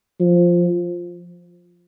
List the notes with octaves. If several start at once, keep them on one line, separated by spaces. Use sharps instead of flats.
F3